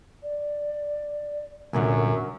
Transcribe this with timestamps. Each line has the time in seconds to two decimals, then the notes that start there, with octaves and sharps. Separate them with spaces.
0.22 D5
1.73 C2 F#2 A#2 D3 A#4